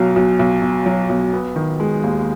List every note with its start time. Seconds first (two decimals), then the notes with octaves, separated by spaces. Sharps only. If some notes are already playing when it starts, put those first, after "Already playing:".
Already playing: B1 B2 F#3
0.16 B1
0.39 B1
0.62 B2
0.86 F#3
1.09 B1
1.33 B3
1.56 D#3
1.80 G#3
2.04 D#2